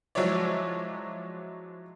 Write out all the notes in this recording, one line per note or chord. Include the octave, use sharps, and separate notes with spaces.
F3 F#3 G#3 E4 C#5 D5